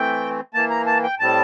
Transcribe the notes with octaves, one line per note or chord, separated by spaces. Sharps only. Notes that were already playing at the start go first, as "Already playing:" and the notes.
Already playing: E3 A3 C4 G5
E3 A#3 A5
A#5
A5
G5
A2 G3 C4 A5